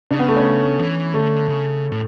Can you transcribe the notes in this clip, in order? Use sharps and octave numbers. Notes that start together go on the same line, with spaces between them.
C#3 D4
B3
A3
C#4
E3
D3 A3
C#3
A2